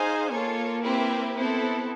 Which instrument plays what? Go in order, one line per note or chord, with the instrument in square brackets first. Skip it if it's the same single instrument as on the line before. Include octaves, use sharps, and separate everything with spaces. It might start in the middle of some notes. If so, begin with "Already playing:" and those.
Already playing: [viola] D#4 [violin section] G#4 C5 F5 G#5
[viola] A#3 [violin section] F4 A4 C#5
[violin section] C4 E4 G4 B4 E5
[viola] B3 [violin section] C4 E4 A4